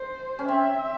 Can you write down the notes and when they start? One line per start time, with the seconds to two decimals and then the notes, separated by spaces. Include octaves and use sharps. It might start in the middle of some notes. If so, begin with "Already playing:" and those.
Already playing: C5
0.39 C#4
0.48 C4 E5